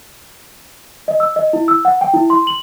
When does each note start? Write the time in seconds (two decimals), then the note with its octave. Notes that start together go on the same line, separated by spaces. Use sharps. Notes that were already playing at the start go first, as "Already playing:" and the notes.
1.08 D#5
1.20 E6
1.36 D#5
1.53 E4
1.68 E6
1.85 F#5
2.01 G5
2.14 E4
2.30 C6
2.47 F#7